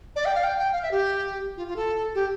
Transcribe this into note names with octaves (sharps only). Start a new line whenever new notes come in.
D5
G5
F5
G5
G5
F5
E5
G4
F4
F4
A4
G4